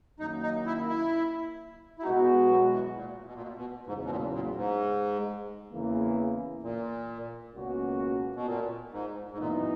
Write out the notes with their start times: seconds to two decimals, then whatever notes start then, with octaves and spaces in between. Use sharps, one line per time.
0.19 F#2 D#3 A#3 D#4
0.43 D#4
0.66 E4
0.89 E4
1.99 E4
2.03 B2 G#3 B3 D#4 F#4
2.49 F#3
2.73 E3
2.96 A#2
3.26 B2
3.34 A#2
3.42 B2
3.56 B2
3.87 E2 G#2 C#3 F#3
4.04 B2
4.10 A#2
4.34 A#2
4.56 G#2
5.71 E2 C#3 E3 A#3
6.63 A#2
7.54 C#2 B2 A#3 C#4 F#4
8.36 B2
8.46 A#2
8.92 G#2
9.31 G#2
9.38 F#2 A#2 E3 B3 D#4